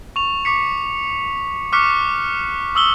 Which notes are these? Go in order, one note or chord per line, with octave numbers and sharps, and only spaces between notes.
C#6 F7
C#6 D6 B6 C#7
C#6 D6 F6 F#6 B6 C#7
C#6 D#6 E6 F#7 G7